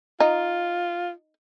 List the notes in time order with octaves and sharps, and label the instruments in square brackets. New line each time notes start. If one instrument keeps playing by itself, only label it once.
[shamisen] D#4 [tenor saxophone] F4